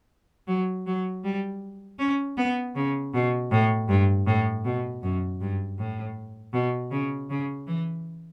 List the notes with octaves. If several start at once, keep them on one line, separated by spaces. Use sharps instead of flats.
F#3
F#3
G3
C#4
B3
C#3
B2
A2
G2
A2
B2
F#2
G2
A2
B2
C#3
C#3
E3